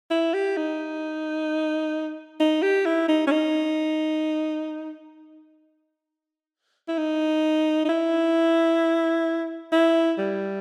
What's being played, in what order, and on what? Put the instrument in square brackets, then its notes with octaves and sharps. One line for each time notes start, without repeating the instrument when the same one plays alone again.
[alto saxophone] E4
G4
D#4
D#4
G4
E4
D#4
C#4
D#4
E4
D#4
D#4
E4
E4
G3